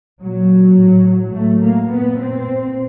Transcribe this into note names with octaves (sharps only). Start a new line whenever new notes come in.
A#2 F#3
A2
A2 A3
A#3
A#2 B3
C4
A#2